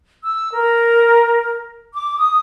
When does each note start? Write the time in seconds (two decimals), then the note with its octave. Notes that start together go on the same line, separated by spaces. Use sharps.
0.23 E6
0.53 A#4
1.94 D6
2.18 D#6